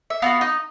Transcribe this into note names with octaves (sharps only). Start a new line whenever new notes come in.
E5
B3 D4 F4 F#4 F5
D#4 D#5